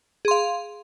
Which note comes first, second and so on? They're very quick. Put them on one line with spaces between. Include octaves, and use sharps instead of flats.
G#4 C6 F5